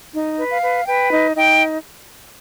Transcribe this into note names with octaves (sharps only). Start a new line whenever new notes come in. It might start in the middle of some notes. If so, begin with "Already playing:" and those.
D#4
B4
F5
B4
B4 G5
D#4
D#4 G5